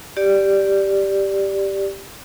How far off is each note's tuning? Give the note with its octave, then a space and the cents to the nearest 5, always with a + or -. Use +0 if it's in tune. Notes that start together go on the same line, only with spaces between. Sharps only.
G4 +0 D5 +0